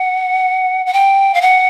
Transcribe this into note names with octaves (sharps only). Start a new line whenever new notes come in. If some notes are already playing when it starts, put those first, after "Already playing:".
Already playing: F#5
F#5
G5
F5
F#5